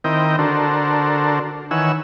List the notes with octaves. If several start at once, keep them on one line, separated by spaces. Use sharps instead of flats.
D#3 C4 E4 A#4 D#5 G5
D3 D4 F#4 A4 A#4 C5
D#3 E3 C#5 F#5 G#5 E6